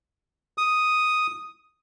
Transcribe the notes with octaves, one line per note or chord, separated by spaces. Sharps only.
D#6